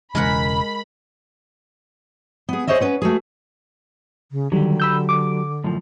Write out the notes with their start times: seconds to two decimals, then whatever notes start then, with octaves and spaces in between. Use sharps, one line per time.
0.15 E1 C#3 E3 G#3 A#4 F#5 B5
2.49 B3 G#4
2.67 G#4 C5 C#5 D#5 E5
2.80 C#4 B4 F#5
3.02 A3 F#4 G#4
4.32 C#3
4.52 D3 D#3 F#3 G3 G4
4.80 B5 E6 G6
5.09 D6
5.64 F#2 A2 F3